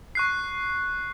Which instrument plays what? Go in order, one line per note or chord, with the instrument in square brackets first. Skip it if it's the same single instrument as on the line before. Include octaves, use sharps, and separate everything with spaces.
[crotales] C#6 F#6 C7